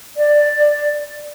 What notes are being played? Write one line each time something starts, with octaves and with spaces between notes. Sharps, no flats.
D5